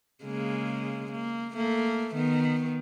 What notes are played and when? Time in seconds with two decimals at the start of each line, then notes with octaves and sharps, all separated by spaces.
0.24 C#3 G#3 A#3
1.12 A#3
1.54 A3 A#3
2.15 D#3 B3